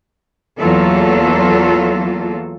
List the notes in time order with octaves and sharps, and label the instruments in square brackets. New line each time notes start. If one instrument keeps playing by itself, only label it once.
[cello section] E2 F#3 A#3 F4 A4